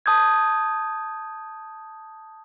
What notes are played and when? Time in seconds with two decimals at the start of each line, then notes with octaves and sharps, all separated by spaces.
0.06 A5 D#6 G6 G#6